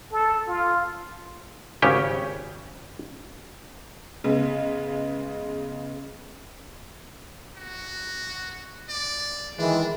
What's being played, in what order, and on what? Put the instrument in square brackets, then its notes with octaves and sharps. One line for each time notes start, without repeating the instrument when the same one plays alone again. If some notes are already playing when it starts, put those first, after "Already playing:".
[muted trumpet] A4
F4
[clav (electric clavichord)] G#1 C#3 C#4 G4 G5
[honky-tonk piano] C#3 G#3 B3
[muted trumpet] F#4
D5
[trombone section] D#3 E3 G#3 [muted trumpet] D4